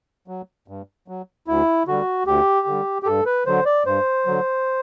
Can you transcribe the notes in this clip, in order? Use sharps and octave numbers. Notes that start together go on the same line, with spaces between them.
F#3
G2
F#3
D2 E4
D3 G3 F#4
D2 G4
D3 G3
G4
G2 A4
B4
D3 F#3 C5
D5
G2 C5
D3 F#3